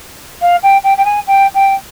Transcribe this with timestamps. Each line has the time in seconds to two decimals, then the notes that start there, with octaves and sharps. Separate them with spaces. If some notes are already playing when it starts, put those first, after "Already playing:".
0.41 F5
0.63 G5
0.84 G5
0.97 G5
1.05 G#5
1.27 G5
1.54 G5